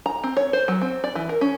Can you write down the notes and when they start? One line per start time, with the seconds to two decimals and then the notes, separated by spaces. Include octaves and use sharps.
0.06 A#5
0.24 C4
0.37 C#5
0.53 C5
0.68 F#3
0.82 C4
1.04 D5
1.15 E3
1.29 A#4
1.41 C#4